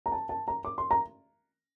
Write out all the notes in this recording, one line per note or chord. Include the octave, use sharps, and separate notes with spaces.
A#5
A5
A5
A#5
D6
C6
A#5